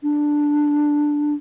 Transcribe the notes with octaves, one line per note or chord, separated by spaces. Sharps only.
D4